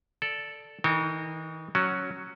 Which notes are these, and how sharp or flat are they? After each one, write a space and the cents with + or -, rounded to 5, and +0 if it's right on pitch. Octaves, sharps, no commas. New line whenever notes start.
A4 +0 D5 -5
E3 -45 D#4 -15 A#4 -45
F#3 +0 C#4 +0 F#4 +10